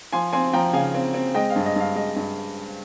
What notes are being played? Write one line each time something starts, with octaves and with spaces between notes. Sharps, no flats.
F3 G#5 C6
C4 G#5 C6
F3 G5 A#5
C#3 F5 G#5
C4
C4
G#3 D#5 G5
F5
G2
D#5
G2 F5
G#3 D#5
G2